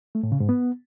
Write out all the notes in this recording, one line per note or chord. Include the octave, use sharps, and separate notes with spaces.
A3
A2
C#3
G#2
B3